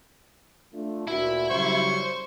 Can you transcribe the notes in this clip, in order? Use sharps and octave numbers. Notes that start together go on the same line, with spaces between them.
A3 D4 F4
D2 A#2 E4 F#4
C#3 F#3 G3 C5 C#6